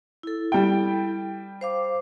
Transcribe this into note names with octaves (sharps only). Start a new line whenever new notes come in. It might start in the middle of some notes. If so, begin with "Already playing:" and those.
E4 A4
G3 G5
C5 F5 D6